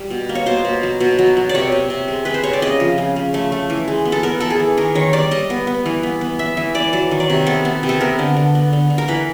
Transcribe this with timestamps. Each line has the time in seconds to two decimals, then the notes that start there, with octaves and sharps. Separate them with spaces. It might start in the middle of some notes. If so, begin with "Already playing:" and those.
Already playing: G3
0.10 B2
0.29 A#3
0.35 C#5
0.46 B2 C5
0.65 B2
0.83 F#3
1.00 B2
1.19 F#3
1.37 F#3
1.49 D5
1.55 C3 C#5
1.72 C3
1.90 C3
2.08 G#3
2.25 G#3 B4
2.34 C5
2.43 C3 C#5
2.53 D5
2.62 C#3 D#5
2.80 F3
2.98 C#3
3.16 C#3
3.34 A3
3.52 A3
3.70 E3
3.88 G#3
4.05 B3
4.12 A4
4.23 B3 A#4
4.40 B3 A4
4.50 G#4
4.60 E3
4.77 D#3 A#4
4.95 D#3 C#5
5.13 G3 D5
5.31 G3 D#5
5.50 B3
5.67 B3
5.86 E3
6.03 B3
6.21 B3
6.39 B3 E5
6.57 E3 E5
6.75 E3 D5
6.93 F#3 D5
7.11 D#3
7.20 D5
7.30 C3
7.46 B3 A4
7.65 B3
7.83 C3
7.89 A4
8.01 B3 A#4
8.19 D3
8.37 D3
8.55 B3
8.73 D3
8.90 D3
8.98 A#4
9.08 E3 B4